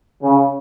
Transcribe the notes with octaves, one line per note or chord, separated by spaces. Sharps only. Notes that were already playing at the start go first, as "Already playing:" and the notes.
C#3